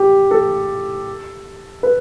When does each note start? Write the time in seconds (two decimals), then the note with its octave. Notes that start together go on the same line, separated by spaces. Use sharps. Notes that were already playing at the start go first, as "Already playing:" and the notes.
Already playing: G4
0.31 A4
1.83 B4